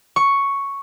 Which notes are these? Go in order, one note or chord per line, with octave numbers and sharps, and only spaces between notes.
C#6